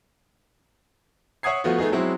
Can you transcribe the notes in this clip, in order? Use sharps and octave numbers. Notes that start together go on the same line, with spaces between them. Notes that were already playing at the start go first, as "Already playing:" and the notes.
C#5 E5 F#5 D#6 G#6 C7
F3 A3 B3 F4 F#4
A3 B3 D#4 G#4
F#3 G#3 C4 E4 F#4